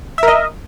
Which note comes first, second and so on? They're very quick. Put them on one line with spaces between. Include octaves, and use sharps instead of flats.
E5 A#4 D#5